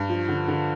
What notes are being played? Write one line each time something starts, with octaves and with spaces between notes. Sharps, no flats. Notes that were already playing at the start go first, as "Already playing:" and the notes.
Already playing: G2
F3
D3
D3